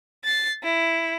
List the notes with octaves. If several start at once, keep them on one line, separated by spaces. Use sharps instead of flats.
A6 C7
E4